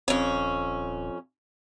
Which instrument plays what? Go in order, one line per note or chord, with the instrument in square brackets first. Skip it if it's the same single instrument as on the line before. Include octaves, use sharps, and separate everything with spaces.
[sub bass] D#1 [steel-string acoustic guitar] F2 C#4